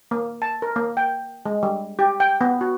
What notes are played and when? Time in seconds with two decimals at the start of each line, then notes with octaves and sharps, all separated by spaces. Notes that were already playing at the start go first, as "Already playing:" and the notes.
0.11 A#3
0.42 A5
0.62 A#4
0.76 A#3
0.97 G5
1.46 G#3
1.63 G3
1.99 G4
2.20 G5
2.41 B3
2.61 F#4